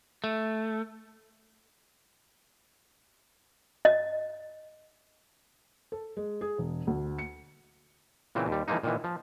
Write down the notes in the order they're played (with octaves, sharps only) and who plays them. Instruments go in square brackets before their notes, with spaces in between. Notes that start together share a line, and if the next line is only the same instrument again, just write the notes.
[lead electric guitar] A3
[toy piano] D#5
[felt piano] A4
G#3
G#4
E1
D2
C#7
[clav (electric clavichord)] A#2 C#3 E3 C4
D#2 G3
E3 F3 G#3 A#3 D#4
A#2 D#3 E3
F3